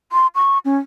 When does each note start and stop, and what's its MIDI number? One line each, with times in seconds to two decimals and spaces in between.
0.12 0.27 84
0.35 0.58 85
0.65 0.77 61